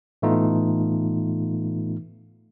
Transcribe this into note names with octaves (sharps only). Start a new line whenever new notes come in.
A2 E3 A3 B3 D#4 F4